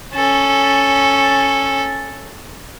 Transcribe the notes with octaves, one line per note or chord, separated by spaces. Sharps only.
C#4 A4